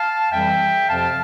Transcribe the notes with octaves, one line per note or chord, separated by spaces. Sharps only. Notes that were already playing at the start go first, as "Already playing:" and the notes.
Already playing: F5 A5
F2 E3 G3 E5 G5
F2 C3 F3 F5 A5